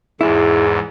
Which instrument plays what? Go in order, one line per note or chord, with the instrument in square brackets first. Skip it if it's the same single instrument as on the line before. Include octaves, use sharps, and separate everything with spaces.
[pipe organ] E2 G#2 [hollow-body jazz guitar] E4 [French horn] G#4